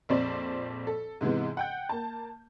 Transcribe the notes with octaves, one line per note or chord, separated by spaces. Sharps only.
A#1 F2 C4 C5 D5
A4
G#2 C3 E3 G#3 B3
F#5 G5 G6
A#3 A5